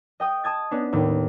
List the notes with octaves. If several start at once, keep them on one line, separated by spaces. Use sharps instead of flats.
D#5 G5 D#6
A5 D#6 G#6 A6
B3 C#4 D4
D#2 A2